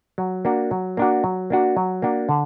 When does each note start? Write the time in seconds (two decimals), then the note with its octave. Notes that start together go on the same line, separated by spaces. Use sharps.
0.18 F#3
0.45 A#3 D4 F#4
0.71 F#3
0.97 A#3 D4 F#4
1.24 F#3
1.50 A#3 D4 F#4
1.77 F#3
2.02 A#3 D4 F#4
2.29 D3